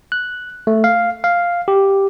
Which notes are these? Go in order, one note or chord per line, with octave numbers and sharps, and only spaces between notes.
F#6
A3
F5
F5
G4